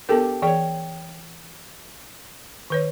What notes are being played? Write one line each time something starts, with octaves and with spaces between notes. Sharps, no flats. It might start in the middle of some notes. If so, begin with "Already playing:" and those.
B3 D4 G4 A4 A#4
E3 G#4 C#5 D5 G5
D#3 B4 C#5